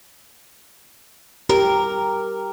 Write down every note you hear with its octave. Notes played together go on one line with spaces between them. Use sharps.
G4 A#4